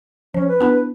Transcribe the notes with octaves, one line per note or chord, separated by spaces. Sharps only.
F3 C#4
B4
B3 D4 E4